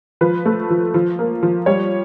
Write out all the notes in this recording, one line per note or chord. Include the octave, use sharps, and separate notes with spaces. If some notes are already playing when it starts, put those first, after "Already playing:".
F3 B4
A3
F3
F3
A#3
F3
G3 C#5